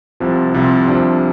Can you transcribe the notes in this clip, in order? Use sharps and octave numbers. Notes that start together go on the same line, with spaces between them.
C2 C3 F3
C2 C3 F3
C2 C3 F3 D4